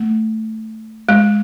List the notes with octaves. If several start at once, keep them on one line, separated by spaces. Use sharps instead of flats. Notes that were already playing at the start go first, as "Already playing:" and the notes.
Already playing: A3
G#3